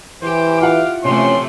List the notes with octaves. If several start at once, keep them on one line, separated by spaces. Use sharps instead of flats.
E3 G4 C5
E4 F4 F5 F#5
C3 E3 F3 A3 C#4 C#5 C6